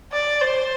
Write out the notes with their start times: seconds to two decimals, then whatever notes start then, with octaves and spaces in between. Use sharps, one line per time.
0.12 D5
0.41 C5